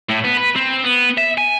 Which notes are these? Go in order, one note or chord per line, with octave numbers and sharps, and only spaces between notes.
A2
B3
B4
C4
B3
E5
G#5